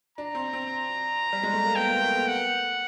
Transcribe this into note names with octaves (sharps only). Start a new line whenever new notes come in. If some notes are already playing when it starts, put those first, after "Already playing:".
D4 A#5
C4
C4
G3
G#3
A3
A#3
B3 G5
A#3
A3
B3
F#5